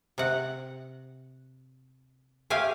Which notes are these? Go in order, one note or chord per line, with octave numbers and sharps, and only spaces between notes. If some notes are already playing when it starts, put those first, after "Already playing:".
C3 F#5
A3 G4 F5 G#5